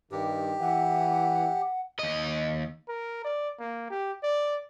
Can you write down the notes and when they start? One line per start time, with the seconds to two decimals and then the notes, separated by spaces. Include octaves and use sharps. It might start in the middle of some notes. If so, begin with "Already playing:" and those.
0.12 G2 D#3 G4
0.60 E3 F#5
1.99 D#2 D#5
2.88 A#4
3.25 D5
3.60 A#3
3.90 G4
4.23 D5